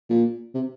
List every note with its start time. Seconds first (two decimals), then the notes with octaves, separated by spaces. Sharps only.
0.10 A#2
0.55 C3